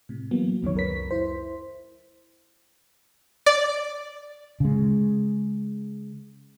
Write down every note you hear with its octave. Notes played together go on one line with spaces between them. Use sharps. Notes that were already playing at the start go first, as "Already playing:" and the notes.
A2 C3
E3 F#3 A#3 B3
C2 F#2 D#3 C#5
C#2 F#2 A#4 B4 B6
E4 C5
D5
C#3 G#3